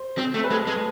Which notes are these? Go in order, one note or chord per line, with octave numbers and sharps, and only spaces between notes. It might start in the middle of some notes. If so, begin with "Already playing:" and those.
Already playing: C5
C4
A3
B4
G#3 A4
G#3